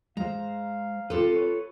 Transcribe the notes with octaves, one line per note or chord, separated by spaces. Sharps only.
G#3 C5 F5 A#5
C4 F4 G4 A4 B4
B4 C#5